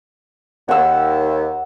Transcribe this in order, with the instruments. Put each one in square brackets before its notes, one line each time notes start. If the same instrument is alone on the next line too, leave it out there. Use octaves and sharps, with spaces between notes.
[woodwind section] D#2 [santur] F#5 E6